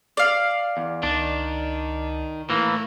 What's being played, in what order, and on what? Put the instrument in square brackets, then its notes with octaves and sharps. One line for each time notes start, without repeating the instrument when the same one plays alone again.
[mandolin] D5 F5
[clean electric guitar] E2
[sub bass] C#2 [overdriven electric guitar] D#3 [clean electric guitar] D4
[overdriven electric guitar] A2 [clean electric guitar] E3 A#3